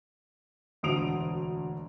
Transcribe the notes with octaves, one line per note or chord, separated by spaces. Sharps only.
E1 D2 D#6 D7 F7